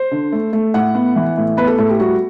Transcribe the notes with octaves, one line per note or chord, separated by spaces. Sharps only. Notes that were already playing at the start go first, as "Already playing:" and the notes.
Already playing: C5
D3
A3
A3
A2 F#5
B3
E3
A2
B3 B4
A4
A2 A4
G4
G3 F#4